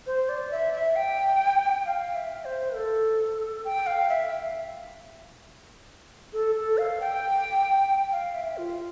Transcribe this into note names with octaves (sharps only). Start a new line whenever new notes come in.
C5
D5
E5
E5
G5
F5
E5
C5
A4
G5
F5
E5
A4
A4
F5
G5
F5
E5
F4